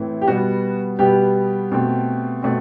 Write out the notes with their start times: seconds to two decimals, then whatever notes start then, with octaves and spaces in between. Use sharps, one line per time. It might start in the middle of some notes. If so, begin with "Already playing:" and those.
Already playing: A2 E3 A3 C4 E4
0.21 G4
0.28 B2 G3 B3 F#4
0.99 B2 G3 B3 G4
1.72 B2 A3 C4
2.42 B2 A3 C4